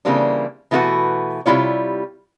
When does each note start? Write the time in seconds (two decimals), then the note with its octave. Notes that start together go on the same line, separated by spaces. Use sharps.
0.05 C#3 E3 G3 A#3 C4 D4
0.71 B2 E3 A3 F4 F#4 B4
1.46 C3 G3 A#3 E4 F4 C#5